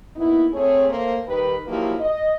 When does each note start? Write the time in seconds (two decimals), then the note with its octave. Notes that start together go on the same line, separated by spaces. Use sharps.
0.16 A#3 B3 D#4 E4
0.53 A3 C4 G#4 C#5
0.88 A3 A#3 A4 A#4 C5
1.27 D#3 G3 G4 B4
1.67 F3 F#3 A#3 D#4 E4 G4
1.99 D#5